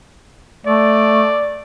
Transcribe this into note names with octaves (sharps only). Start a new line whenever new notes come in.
A3 D5